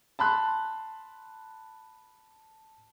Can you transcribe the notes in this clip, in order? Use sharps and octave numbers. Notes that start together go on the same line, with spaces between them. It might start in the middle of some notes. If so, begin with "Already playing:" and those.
A5 B5 C6 F#6